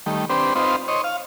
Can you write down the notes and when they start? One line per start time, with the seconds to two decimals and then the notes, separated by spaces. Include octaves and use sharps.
0.06 D#3 G3 A3
0.30 C4 D4 G4 B4 C5
0.56 C4 D#4 F4 B4 C5
0.88 C5 C#5 D#5
1.04 F5